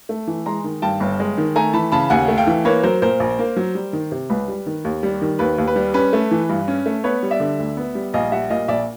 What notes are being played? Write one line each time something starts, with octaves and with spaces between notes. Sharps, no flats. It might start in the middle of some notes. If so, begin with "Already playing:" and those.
A3
E3
G#3 A#5 C6
D#3
G2 G5 A5
G1
G#3
D#3
A3 G#5 A#5
E3 A5 B5
C#3 A5 B5
D#2 F#5 G#5
A3
F5 G5
E3
A#3 B4 C#5
F#3 A#4 C5
A#2 A#4 C5
A#1
A#3
F#3
G3
D#3
C3
C#2 B4
G3
D#3
D#2
G3
D#3
D#2 B4
D#2
B4
G3
C#4 B4
A3
E3
G2
C#4
A3
B3 B4 C#5
G3
D5 E5
D3
D2
B3
G3
A#1 D#5 F5
G3 E5 F#5
A#2 D#5 F5
A#1 D5 E5